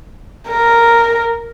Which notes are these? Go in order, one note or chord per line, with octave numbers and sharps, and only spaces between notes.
A#4